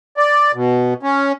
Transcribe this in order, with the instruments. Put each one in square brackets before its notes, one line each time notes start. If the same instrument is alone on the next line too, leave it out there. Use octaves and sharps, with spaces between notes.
[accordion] D5
B2
C#4